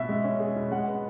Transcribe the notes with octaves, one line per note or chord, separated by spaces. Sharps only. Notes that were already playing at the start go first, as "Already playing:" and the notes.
Already playing: B2 E5
G#3
C#4
G#4
B2
G#3 F#5
B3